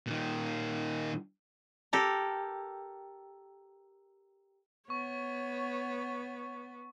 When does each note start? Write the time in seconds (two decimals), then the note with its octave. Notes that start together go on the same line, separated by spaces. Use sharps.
0.07 A#2 D#3
1.93 G4 A4 A#4
4.90 B3 C#5 C#6